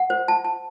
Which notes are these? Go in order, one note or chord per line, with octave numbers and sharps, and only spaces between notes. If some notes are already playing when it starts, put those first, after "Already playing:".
Already playing: F#5
C5
A5
A5